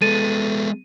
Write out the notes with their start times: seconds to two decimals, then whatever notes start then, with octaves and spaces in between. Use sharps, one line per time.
0.02 G#3 B3 A4 A6 D#7